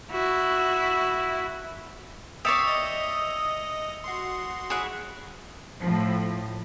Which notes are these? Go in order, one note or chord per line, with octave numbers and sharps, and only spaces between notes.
E4 F#4
C#5 D5 E5 G5 D6 D#6 C7 C#7
D#5
F#4 C6
E4 G#4 C#5 F#5
A2 F3